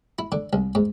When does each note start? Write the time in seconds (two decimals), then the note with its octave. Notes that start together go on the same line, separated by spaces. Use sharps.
0.19 E4
0.32 D3
0.53 C2
0.75 G#2